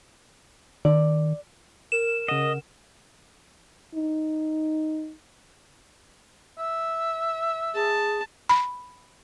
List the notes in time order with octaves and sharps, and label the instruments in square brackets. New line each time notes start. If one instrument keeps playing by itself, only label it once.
[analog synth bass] D#3 [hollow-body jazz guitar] D5
[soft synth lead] A#4 [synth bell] E7
[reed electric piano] C#3 F#5 [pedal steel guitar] D#5
[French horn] D#4
[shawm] E5
[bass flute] G#4 [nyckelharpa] A5
[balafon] B5